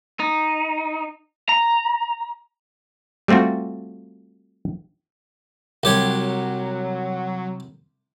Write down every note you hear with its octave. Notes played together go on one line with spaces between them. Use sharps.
D#4
A#5
G3 A3 C4 F4 F#4
C2 F#3 G4 C#5